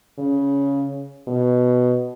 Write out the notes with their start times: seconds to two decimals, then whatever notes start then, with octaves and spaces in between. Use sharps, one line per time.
0.19 C#3
1.28 B2